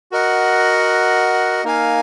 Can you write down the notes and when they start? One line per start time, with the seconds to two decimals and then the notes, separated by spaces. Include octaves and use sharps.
0.12 F#4 A#4 D#5 F#5
1.64 A#3 D#4 A#4 F5 G#5